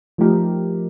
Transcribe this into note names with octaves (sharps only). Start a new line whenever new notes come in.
F3 A3 D#4 G4 A#4